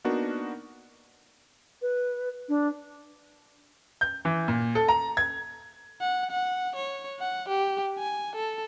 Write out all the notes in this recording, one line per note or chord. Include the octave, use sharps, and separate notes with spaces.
A#3 B3 D4 D#4 F#4 A#4
B4
D4
G6
E3
A#2
A4
A#5
G#6
F#5
F#5
C#5
F#5
G4
G#5
A4